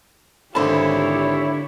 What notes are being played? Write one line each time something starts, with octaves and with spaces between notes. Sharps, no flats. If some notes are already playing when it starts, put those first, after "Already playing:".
G#1 D3 E4 G4 C5 C#5 A5 B5